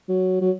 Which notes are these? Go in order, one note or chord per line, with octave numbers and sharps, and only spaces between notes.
F#3
F#3